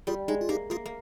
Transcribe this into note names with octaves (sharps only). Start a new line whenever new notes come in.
G3 F4 G#4
G#3 D#4
F4
A#3 D#4 G4
A#3 F4 G#4
A#3